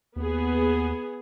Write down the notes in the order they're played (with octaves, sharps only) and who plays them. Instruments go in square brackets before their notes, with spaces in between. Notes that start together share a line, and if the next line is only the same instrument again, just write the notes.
[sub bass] D#2 [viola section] B3 G#4